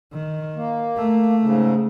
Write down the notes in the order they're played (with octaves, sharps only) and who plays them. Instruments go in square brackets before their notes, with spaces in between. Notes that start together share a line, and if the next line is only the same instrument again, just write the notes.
[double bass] D#3
[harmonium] A#3
[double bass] A3
[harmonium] G#2 C#3